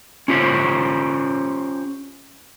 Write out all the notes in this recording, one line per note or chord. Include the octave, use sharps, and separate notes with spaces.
C#4 F4 G4 C5 C#5